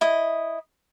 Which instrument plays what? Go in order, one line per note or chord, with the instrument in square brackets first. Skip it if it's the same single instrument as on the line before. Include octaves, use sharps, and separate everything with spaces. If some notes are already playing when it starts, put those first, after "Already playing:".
[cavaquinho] E4 D#5